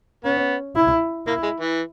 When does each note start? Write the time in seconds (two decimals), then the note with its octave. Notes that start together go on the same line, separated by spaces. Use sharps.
0.25 B3 C#4
0.76 E4
1.27 A#3 E4
1.43 G#3
1.60 E3